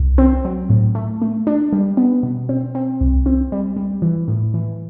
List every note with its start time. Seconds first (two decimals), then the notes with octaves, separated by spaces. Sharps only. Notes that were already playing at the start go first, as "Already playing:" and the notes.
Already playing: C2
0.18 C4
0.45 F#3
0.70 A2
0.95 A3
1.22 A3
1.47 D4
1.73 G3
1.97 B3
2.23 B2
2.49 C4
2.75 C4
3.01 C2
3.26 C4
3.52 G3
3.77 G3
4.02 E3
4.28 A2
4.54 E3